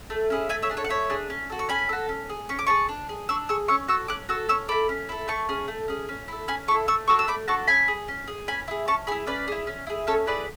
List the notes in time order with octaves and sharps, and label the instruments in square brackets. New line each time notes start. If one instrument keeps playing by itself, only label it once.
[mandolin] A3
C#4 E4 G#4
A3 E5 G#5
C#5 E5
D4 G#4
A4 C#5
F#5
A3 C#5 E5
D4 G#4
C#4
F#4 A4
C#6
C#4 G#5 B5
F#4 A4
C#4
G#4
C#4 C#6
D6
G#4 A5 C#6
D4
G#4
D4 C#6 E6
G#4 C#6 E6
C#4 C#6 E6
F#4 A4 C#6 E6
C#4 D6 F#6
F#4 A4 C#6 E6
C#4 C#6 E6
E4 A4 B5 D6
C#4
E4 A4
A3 A5 C#6
C#4 G#4
A3
C#4 G#4
C#4
E4 A4
C#4 G#5 B5
A4 A5 C#6
E4
A3 C#6 E6
D4 F#4 A4 C#6 E6
E6
A3 B5 D6
D4 F#4 A4 A5 C#6
C#4 G#5 B5
G#4
C#4
G#4
C#4 G#5 B5
E4 G#4
C#4 A5 C#6
G#4 G#5 B5
E4
C#4 B4 D5
E4 G#4
C#4
E4 G#4
C#4 A4 C#5
E4 G#4 B4 D5